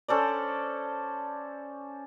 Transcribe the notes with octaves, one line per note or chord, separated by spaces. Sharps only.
C#4 A4 C5 D5